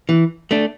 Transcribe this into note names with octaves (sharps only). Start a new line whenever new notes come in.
E3
A3 D4